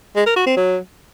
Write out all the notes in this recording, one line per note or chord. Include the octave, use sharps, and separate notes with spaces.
G#3
A#4
F#4
C4
F#3